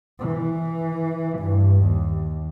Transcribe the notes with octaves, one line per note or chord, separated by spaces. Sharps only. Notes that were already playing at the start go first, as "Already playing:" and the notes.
E3
G2
D#2